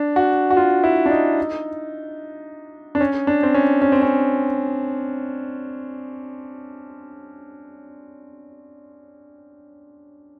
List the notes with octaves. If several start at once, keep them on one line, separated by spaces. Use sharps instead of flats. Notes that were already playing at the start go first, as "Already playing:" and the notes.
Already playing: D4
F#4
F#4
F4
E4
D4
D#4
D4
C#4
D4
C4
C#4
C#4
C4
C#4